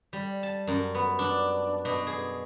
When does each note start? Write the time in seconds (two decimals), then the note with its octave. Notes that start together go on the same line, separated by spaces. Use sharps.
0.13 G3
0.43 A5
0.67 F#2
0.95 B3
1.19 D4
1.85 B2
2.07 G#4